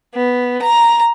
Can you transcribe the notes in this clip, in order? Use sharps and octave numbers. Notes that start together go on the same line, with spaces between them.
B3
A#5